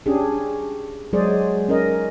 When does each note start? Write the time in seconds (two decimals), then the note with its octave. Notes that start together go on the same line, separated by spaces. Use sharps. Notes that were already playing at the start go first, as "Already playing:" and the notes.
0.06 C#4 D4 G4 G#4
1.13 F#3 G#3 G#4 C5 D5
1.68 C#4 A#4 D#5